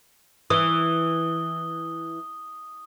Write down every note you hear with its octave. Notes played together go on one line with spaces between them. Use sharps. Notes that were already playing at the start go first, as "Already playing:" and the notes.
E3 D#6 G7